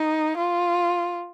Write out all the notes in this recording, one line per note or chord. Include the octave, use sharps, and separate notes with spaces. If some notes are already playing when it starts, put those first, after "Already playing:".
Already playing: D#4
F4